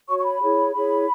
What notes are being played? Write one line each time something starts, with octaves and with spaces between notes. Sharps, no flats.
F#4 C#5 C#6
C#6
B5
E4 G#4 C#5
E4 G#4 C#5 B5